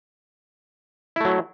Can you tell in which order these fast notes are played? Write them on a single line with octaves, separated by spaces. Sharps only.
E4 A3 F#3